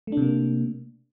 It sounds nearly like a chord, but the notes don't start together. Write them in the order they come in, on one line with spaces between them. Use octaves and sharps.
A3 D4 C3 A#3